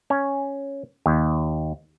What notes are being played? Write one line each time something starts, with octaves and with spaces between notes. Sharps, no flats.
C#4
D#2